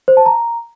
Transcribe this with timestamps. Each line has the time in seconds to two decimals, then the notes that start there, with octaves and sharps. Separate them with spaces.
0.08 C5
0.17 A5
0.26 A#5